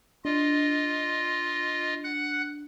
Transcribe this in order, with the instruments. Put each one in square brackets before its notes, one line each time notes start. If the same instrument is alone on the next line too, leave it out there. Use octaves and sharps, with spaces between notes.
[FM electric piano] D4 [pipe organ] F4 D#5
[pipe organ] F#5 F#6